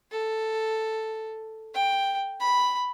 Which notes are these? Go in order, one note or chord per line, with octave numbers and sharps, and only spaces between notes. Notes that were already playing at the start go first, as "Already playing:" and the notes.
A4
G5
B5